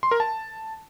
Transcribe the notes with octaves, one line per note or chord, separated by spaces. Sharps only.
C6
A#4
A5